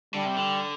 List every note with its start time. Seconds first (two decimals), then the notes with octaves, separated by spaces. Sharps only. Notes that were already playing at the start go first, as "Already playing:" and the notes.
0.14 D3 G3
0.25 C3
0.36 D3